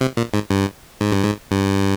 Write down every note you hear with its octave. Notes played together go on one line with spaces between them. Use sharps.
C3
A#2
G#2
G2
G#2
G2
G#2
G2